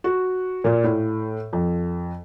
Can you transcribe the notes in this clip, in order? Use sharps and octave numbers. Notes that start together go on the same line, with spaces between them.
F#4
A#2
A2
F2